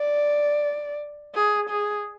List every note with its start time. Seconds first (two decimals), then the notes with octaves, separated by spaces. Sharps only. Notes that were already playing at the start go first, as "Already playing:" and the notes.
Already playing: D5
1.35 G#4
1.70 G#4